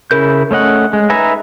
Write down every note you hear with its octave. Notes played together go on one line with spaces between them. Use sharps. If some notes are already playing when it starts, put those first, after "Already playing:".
C#3 E4 A#4 G6
A3 C#4 D#5 F#5
G#3
D#4 B4 E5 G#5 A#5